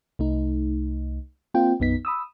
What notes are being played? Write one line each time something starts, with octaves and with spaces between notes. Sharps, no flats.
C2 A3 D#4
A#3 C4 F4 G5
B1 F#2 B3 D#4 B6
B5 D#6 E6